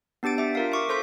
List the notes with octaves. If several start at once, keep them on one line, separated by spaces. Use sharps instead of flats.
B3 D4 G4 A6 D7
D4 G4 E5
F4 A#4 F5
E5 C#6 D6
A4 C5 C6 G6 B6